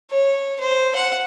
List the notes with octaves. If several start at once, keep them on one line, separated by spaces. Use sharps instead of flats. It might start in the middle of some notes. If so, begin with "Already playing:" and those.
C#5
C5
F#5